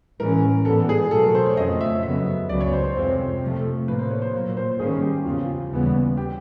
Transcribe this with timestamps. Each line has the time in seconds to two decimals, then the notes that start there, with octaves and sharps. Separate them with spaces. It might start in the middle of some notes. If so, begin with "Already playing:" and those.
0.20 A2 E3 G#3 C#4 A#4
0.65 G#2 E3 G3 B3 A4
0.89 G#4
1.11 B2 F#3 A3 A4
1.23 A#4
1.35 C5
1.46 C#5
1.57 F2 C#3 F3 A3 C4 D#5
1.81 E5
2.03 F#2 C#3 F#3 B3 E5
2.49 C#2 C#3 F#3 B3 D5
2.61 C#5
2.73 C5
2.84 C5
2.96 F2 C3 F3 G#3 C4
3.41 C3 F3 A3
3.88 A2 F3 A#3 B4
3.99 C5
4.11 C#5
4.22 C5
4.34 A#2 F#3 A#3
4.57 C5
4.79 G#2 D#3 G3 A#3 C#4 G#4
5.02 G4
5.25 E2 C#3 F3 F4
5.72 D#2 C#3 E3 G3 B3
6.17 G4